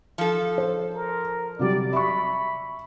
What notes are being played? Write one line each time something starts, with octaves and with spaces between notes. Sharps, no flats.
F3 A4
C5
A#4
C3 F#3 G3 D5
E5 B5 C#6